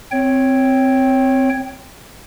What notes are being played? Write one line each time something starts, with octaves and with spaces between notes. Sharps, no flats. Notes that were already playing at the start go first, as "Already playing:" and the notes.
C4 C#5 G5